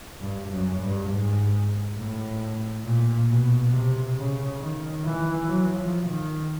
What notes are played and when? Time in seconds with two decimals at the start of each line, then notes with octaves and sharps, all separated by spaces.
0.20 G2
0.50 F#2
0.79 G2
1.09 G#2
1.97 A2
2.84 A#2
3.29 B2
3.72 C3
4.16 C#3
4.60 D#3
5.04 E3
5.49 F#3
5.78 F3
6.07 D#3